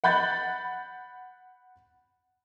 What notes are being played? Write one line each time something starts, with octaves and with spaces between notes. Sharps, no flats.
F#5 B5 G6 A6